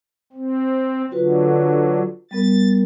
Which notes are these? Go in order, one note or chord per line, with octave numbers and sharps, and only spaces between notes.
C4
D3 F#3 F4 F#4 B4
G3 B3 A#4 A6